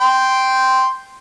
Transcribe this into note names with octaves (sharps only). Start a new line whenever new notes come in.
G5 C6